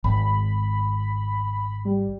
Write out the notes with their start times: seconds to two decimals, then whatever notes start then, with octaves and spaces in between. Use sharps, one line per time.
0.04 G#1 B5
1.85 G3